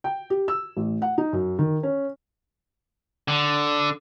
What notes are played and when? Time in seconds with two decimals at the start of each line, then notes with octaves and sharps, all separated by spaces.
0.04 G5
0.30 G4
0.48 E6
0.77 A1
1.02 F#5
1.18 D#4
1.33 F#2
1.59 D#3
1.83 C#4
3.28 D3